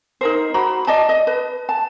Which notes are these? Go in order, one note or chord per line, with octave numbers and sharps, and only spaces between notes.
D#4 A#4 C5
F#4 C5 A#5 B5
D5 D#5 A5
D#5
B4
A5